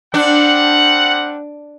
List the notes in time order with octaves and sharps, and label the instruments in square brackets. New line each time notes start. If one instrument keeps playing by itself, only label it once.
[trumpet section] G3 C4 F#5 [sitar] D4